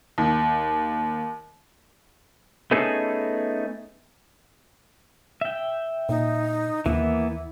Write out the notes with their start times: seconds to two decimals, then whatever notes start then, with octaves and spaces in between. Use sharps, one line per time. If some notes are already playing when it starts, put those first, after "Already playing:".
0.18 D#2
2.71 A3 B3 C#4 D#4 G#4 A4
5.41 E5 G5
6.09 A#2 D#4
6.86 D#2 E3 A#3 B3 E4